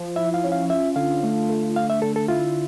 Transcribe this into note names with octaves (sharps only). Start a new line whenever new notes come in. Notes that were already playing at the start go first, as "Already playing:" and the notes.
Already playing: F3
E4 E5
F5
C#4
F5
F4 E5
D3 F5
A3
A3
D3 F5
E5
D3 A4
A4
E4 F4